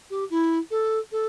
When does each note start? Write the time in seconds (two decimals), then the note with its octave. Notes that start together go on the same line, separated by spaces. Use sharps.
0.10 G4
0.30 E4
0.70 A4
1.12 A4